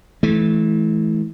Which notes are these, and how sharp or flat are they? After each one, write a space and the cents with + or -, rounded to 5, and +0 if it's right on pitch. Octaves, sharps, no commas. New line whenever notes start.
E3 -10 A3 -35